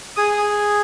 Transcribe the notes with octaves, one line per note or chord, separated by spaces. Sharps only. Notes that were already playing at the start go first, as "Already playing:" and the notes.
G#4 D#6